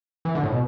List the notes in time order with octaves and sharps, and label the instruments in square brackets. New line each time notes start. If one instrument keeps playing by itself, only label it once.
[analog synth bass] E3
D3
A2
B2